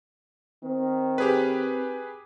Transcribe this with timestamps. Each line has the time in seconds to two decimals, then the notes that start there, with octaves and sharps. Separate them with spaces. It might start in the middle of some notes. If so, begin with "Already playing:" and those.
0.64 D#3 C4
1.18 G4 G#4 B4